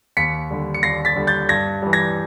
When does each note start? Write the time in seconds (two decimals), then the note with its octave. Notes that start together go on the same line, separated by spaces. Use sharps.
0.17 D#2 B6 C#7
0.51 D3 G3
0.74 C#7
0.83 D#2 A#6 C7
1.05 A6 B6
1.16 D3 G3
1.27 G6 A6
1.49 G2 G#6 A#6
1.82 E3 G3
1.93 G#6 A#6